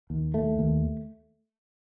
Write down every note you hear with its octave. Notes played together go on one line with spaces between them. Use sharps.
D#2
A3
D#2